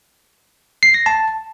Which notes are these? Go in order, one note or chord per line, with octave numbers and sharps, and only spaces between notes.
C7
A#6
A5